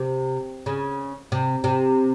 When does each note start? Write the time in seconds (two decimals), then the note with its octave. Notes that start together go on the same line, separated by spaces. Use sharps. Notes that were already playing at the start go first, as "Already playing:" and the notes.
Already playing: C3
0.66 C#3
1.32 C3
1.64 C3